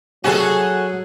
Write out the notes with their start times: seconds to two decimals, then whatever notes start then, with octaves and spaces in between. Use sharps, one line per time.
0.24 C3 F#3 G3 C#4 F#4 G#4 A4